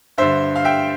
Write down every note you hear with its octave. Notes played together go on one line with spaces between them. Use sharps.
G2 D3 C5 E5
F5
E5 G5